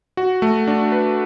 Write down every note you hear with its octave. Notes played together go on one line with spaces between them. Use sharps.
F#4
A3
D4
B4